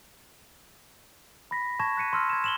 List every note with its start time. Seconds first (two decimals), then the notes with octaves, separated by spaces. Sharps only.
1.51 B5 A#6 B6
1.80 A5 C#6 G#6 A#6 E7
1.97 F#6 B6 C#7 D#7
2.13 C6 E6 F6 A#6
2.30 G#6 E7
2.44 E7 F#7 G7